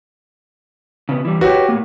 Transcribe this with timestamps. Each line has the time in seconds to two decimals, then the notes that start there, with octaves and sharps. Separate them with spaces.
1.09 C#3 B3
1.25 E3 G3
1.41 F#4 G4 B4 C#5
1.69 A2 A#3